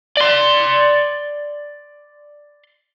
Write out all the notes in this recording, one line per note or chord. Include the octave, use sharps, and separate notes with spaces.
D5 C6